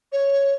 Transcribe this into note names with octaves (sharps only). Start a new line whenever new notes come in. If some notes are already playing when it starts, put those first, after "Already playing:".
C#5